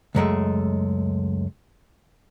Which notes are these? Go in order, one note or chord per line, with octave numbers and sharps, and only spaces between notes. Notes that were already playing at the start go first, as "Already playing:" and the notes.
C#2 F#2 G#3 A3